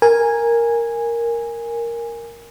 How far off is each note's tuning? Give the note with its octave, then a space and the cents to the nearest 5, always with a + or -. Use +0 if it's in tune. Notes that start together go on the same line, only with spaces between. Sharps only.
A#4 +0 G#5 -10